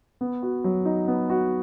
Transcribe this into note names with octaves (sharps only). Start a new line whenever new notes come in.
B3
F#4
F#3
D#4
B3
F#4